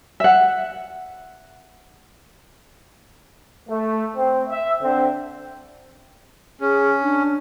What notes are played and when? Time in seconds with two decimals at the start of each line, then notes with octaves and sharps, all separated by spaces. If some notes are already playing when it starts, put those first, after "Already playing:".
0.20 E5 F#5
3.69 A3
4.17 C4
4.49 E5
4.82 D3 C4
6.61 C#4 G#4
7.02 D4